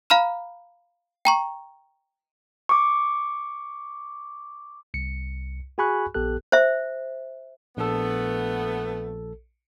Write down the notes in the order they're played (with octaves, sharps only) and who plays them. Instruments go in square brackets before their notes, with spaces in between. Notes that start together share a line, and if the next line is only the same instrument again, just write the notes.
[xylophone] F5 A#5 B5 F6 E7
G5 A#5 C#6
[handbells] C#6 D6
[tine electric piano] C2 C#7
F#4 G#4 G#5 B5 C#6 F#6
A#1 B3 G4 A4 F#6
[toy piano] C5 E5
[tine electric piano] A#1 A4 [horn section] A3 B3